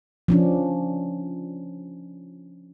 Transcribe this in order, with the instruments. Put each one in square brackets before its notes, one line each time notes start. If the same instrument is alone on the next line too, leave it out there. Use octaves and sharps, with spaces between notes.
[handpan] F3 C#4 D4